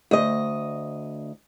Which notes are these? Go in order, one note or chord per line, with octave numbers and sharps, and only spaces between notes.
D2 D#5